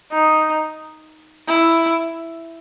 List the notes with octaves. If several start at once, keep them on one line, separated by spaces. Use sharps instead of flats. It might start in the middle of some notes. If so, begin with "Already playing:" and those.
D#4
E4